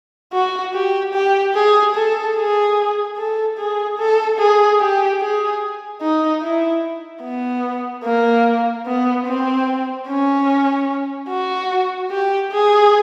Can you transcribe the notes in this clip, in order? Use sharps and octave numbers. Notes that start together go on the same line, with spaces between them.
F#4
G4
G4
G#4
A4
G#4
A4
G#4
A4
G#4
G4
G#4
D#4
E4
B3
A#3
B3
C4
C#4
F#4
G4
G#4